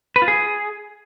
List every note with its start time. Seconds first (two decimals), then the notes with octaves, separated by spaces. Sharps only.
0.16 B4
0.22 F4
0.28 G#4